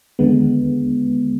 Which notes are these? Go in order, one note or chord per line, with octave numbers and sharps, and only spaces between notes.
D#2 D3 G#3 B3